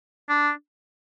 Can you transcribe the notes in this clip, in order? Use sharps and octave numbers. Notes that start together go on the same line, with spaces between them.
D4